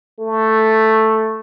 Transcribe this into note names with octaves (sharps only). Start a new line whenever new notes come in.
A3